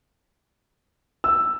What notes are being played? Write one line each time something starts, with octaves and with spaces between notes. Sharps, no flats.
E6